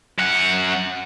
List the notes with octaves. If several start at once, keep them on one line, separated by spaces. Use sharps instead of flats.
F#2 F#5